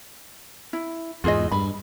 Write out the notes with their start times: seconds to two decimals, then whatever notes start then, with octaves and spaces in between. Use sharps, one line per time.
0.73 E4
1.24 E2 G#2 F4 G#4 D#5
1.52 G2 B5